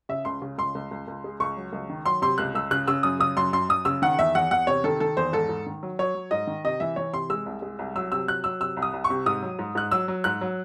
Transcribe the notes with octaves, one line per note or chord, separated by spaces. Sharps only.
C#3 E5
C#2 C6
C#3
C#2 C6
C#2
C#2
C#2
G#3
C#2 C#6
F#3
C#2
D#3
F#3 C6
C3 C6
C#2 F#6
C#2 E6
C#3 F#6
C#3 E6
F#2 D#6
C#3 D#6
F#2 C6
F#2 C6
F#2 D#6
C#3 E6
D#3 F#5
E2 E5
E2 F#5
E2 F#5
C3 C#5
D#3 A4
D#3 A4
E2 C5
G#2 A4
G#2
D#3
F#3
F#3 C#5
F#3
G#2 D#5
D#3
C3 D#5
E3 E5
E3 C#5
C3 C6
G#3 E6
C2
G#3
C2
F#3 E6
C3 E6
F#3 F#6
F#3 E6
C3 E6
C2
D#6
C2
C#6
C3
G#2 D#6
F#3
G#2
G#2 F#6
F#3 E6
F#3
G#2 F#6
F#3